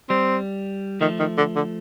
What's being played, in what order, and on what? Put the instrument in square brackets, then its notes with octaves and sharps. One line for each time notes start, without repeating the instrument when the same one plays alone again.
[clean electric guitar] G3 [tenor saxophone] C4
[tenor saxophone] D#3 [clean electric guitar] F3 A3
[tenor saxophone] D#3
D3
D3